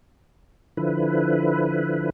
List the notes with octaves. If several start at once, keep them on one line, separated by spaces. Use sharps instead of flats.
D3 F3 E4 B4